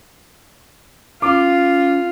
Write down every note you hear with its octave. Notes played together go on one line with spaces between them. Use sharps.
C#4 F4 D6